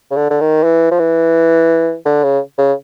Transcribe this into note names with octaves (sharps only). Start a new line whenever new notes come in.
C#3
D3
D3
D#3
E3
F3
E3
D3
C#3
C#3